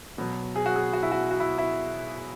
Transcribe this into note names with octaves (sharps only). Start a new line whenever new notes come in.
B2 F#3
G#4
F#4
G#4
F#4
E4
F#4
F#4
E4
E4